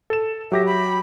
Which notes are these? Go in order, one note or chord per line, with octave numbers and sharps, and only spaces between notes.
A4 E7
F#3 G4 E5 A#6
B5